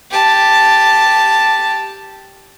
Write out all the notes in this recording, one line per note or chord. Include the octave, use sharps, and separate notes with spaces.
G4 A5